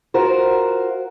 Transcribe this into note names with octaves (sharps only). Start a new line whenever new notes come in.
F4 F#4 A#4 C5